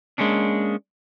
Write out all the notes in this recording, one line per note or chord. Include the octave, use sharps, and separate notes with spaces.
G#3 A#3 C#4 D4